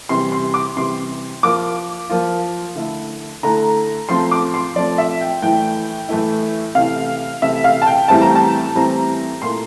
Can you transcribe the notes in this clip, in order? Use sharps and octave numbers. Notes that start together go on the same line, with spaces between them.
C3 E3 G3 C6
C6
D6
C3 E3 G3 C6
F3 A#3 F4 D6
F3 A#3 F4
D3 A3 E4
D3 A3 E4 A#5
F3 A3 C4 C6
D6
C6
F3 A3 C4 D5
E5
G5
A2 E3 A3 E4 G5
A2 E3 A3 E4
C3 E3 A3 E4 F5
C3 E3 A3 E4 E5
F5
A5
G5
A2 E3 G3 C4 E4 A5
A#5
A5
A2 E3 G3 C4 E4 A#5
A#2 A3 E4 C6